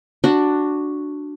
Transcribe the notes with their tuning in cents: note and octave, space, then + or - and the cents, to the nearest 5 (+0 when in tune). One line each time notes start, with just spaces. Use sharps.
D4 +5 F#4 +0